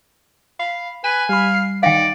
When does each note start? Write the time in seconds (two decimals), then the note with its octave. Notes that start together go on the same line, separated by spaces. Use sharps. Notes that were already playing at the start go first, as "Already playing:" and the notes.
0.59 F5 B5
1.04 B4 G#5 D#7
1.29 G3 F5 B5
1.54 C7
1.83 D#3 D#4 D5 F5 G5 A#6